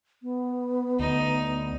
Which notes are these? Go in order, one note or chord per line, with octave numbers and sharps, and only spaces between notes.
B3
D2 D#4